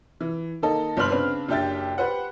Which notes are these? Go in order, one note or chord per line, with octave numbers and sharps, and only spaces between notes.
E3
D#3 A#3 A4 D#5
G1 G3 B4 C6 F6 F#7
C#3 C4 D4 B4
F#1 D4 G4 E5 G5 A6
G4 B4 C5 F#5